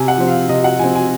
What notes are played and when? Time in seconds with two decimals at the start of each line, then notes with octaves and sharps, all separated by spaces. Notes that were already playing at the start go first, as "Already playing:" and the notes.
Already playing: C3 G#5
0.08 F#5
0.18 F3 C4
0.28 F5
0.48 C3 D#5
0.64 F#5
0.79 F3 C4 G#5
0.95 G#5